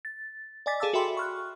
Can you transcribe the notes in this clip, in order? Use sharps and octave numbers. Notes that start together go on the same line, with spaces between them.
A6
D5 D#5 G#5 D6 A6 B6
G#4 A4 F5 A5 D6 E6
F#4 A4 E5 G5 B5 C6
C#6 F6 F#6